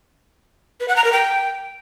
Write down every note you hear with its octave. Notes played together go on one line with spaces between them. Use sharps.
B4
F#5
A#5
A#4
G5